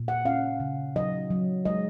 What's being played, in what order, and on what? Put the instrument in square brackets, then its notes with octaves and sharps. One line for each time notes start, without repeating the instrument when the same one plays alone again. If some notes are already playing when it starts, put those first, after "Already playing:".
Already playing: [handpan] A#2
F#5
C#4 F5
C#3
F#3 D#5
F#3
G#3 D#5